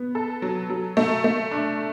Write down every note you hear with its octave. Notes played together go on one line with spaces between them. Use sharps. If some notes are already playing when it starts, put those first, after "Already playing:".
Already playing: B3
A4
F#3
F#3
A3
A3
D4